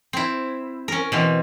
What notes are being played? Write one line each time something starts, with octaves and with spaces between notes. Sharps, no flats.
C4 E4
C#4 A#4
B2 E3 C4